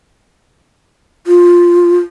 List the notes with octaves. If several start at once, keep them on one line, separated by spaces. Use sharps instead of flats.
F4